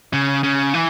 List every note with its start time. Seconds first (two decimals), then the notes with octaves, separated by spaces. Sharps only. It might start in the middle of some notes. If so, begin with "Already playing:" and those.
0.13 C#3
0.43 C#3
0.74 E3